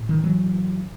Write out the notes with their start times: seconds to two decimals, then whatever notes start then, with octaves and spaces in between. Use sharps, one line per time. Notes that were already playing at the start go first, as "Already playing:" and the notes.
Already playing: A2
0.09 D#3
0.24 E3 F#3